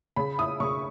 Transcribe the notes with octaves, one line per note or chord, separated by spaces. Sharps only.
C#3 B5
E4 D#6
C#3 C#6